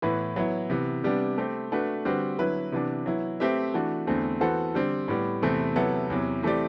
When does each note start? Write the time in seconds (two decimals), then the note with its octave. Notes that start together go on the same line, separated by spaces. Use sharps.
0.02 A2 E3 B3 E4 B4
0.36 F#3 B3 E4
0.70 C3 E3 B3
1.04 C3 G3 B3 D4
1.38 A3 C4 G4
1.72 A3 D4 F#4 B4
2.05 D3 G3 C4 F#4 B4
2.39 D3 F#3 B3 E4 B4
2.72 C3 E3 B3 D4
3.06 F#3 B3 E4
3.40 A3 C4 G4 B4 E5
3.74 E3 A3 D4 F#4
4.07 E2 D3 A3 C4
4.41 E3 B3 F#4 A4 C5
4.74 D3 G3 C4
5.08 A2 G3 B3
5.42 E2 C3 E3 A3 C4
5.76 C3 F#3 B3 E4 A4
6.10 E2 C3 F#3
6.43 E3 A3 C4 G4 D5